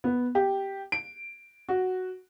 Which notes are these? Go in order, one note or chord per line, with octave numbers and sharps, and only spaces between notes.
B3
G4
D7
F#4